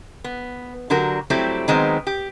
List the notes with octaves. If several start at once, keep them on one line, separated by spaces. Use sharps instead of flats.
B3
D3 F#3 F#4 G4 A#4
F#3 G3 A3 C4 E4 G4
D#3 F#3 G#3 B3 C4
G4